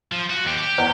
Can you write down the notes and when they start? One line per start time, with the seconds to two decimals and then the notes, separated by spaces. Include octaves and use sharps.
0.12 F3
0.30 F#4
0.45 D#2 G4
0.58 G4
0.78 E2